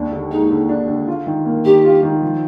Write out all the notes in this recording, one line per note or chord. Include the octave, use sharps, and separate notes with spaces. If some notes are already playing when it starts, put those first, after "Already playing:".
Already playing: D#2 D4
D3
G#3 D#4
D3
D4
D3
F4
D#3
A#3
D#3 G4
F4
D#3
F3